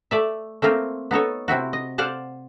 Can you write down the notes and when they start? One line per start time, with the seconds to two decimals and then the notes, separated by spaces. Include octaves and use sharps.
0.11 A3 D5 E5
0.62 A3 A#3 C4 F4
1.11 B3 D#4 A4 C#5
1.48 C3 C4 E4 F#4
1.73 D#5
1.98 C5 D5 F5 F#5 A5